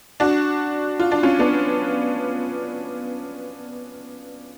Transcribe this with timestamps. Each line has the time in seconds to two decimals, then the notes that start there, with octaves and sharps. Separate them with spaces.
0.20 D4 F#4
1.00 F4
1.12 D4
1.23 C#4 F4
1.39 B3 D4